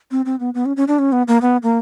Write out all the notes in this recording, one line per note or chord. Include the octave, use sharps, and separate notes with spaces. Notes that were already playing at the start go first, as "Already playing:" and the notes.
C4
C4
B3
B3
C#4
C#4
D4
C#4
B3
A#3
B3
A#3